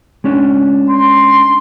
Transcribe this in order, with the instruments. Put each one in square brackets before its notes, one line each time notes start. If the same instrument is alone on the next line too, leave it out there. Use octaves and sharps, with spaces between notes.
[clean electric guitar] G#3 C#4 D4
[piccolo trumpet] C6